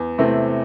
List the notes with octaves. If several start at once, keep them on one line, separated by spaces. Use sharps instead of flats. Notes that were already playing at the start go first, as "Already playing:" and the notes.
Already playing: E2
C3 E3 A3 C4